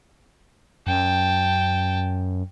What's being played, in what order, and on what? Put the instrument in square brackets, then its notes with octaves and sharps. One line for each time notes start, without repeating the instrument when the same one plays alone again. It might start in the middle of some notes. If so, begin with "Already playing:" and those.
[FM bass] F#2 [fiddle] G5 A5